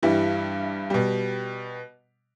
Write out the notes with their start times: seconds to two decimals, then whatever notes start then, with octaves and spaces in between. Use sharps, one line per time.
0.03 G2 E3 G3 E4
0.90 B2 G3